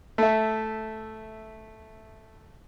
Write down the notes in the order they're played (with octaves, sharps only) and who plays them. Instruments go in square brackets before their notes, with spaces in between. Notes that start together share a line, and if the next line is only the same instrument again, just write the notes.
[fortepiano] A3 E5